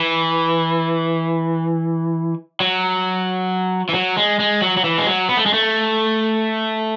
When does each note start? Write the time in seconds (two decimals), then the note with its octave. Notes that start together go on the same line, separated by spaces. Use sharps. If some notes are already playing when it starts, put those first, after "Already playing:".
Already playing: E3
2.60 F#3
3.89 E3
3.94 F#3
4.17 G#3
4.40 G#3
4.62 F#3
4.77 F#3
4.84 E3
4.98 G#3
5.06 F#3
5.29 B3
5.37 A3
5.46 G#3
5.54 A3